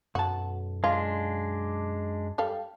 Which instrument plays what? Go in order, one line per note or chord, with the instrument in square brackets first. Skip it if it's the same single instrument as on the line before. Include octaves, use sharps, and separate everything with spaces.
[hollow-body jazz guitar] B1 A5 [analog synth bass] F#2 [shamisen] F#4
[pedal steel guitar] G#3 D4 [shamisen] F4
[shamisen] G3 A4 F5